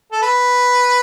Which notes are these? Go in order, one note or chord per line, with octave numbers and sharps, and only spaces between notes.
A4
B4